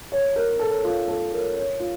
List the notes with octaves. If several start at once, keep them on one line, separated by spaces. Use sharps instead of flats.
C#5
A#4
A4
F4
A4
A#4
C#5
F4